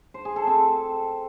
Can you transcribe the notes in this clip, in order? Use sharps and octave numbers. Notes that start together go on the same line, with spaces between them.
C5
G#4
A4
C4